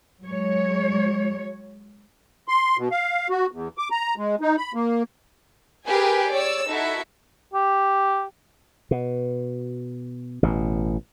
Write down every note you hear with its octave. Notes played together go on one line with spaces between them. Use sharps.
F#3 G#3 C#5
C6
B2
F5
F#4
E2
D6
A#5
G#3
D#4
B5
A#3
G4 G#4 A#4 B4 G5 G#5
C#5 D5 E6
D#4 E4 F#4 A4 E5
G4
B2
A1 B2